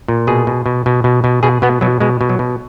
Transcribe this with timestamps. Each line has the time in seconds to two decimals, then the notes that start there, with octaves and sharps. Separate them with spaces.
0.08 A#2
0.27 B2 G#4
0.47 B2
0.66 B2
0.86 B2
1.04 B2
1.24 B2
1.43 B2 G#4
1.62 B2 B3
1.81 B2 F#3
2.00 B2 G#3
2.21 B2
2.29 F#3
2.39 B2